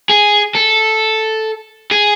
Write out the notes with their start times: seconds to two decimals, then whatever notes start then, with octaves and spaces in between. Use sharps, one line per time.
0.10 G#4
0.55 A4
1.92 G#4